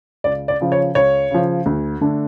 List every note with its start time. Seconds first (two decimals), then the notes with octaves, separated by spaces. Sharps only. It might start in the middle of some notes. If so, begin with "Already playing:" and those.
0.24 C#2 D5
0.48 D5
0.61 C#3 F3
0.72 C#5
0.95 C#2 C#5
1.31 C#3 F3
1.66 D2
2.01 D3 A3 D4